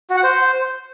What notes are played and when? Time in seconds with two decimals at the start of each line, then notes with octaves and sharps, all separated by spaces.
0.10 F#4
0.17 F#5
0.23 C5